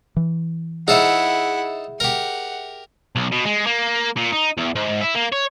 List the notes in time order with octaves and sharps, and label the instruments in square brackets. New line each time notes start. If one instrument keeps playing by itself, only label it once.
[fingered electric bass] E3
[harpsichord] D#4 A4 C5 [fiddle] E4 F#5 [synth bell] G#4 E5
[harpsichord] G4 A#4 [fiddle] F#5
[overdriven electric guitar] B1
B2
G#3
A#3
A#2
D#4
E2
G#2
E4
A#3
C#5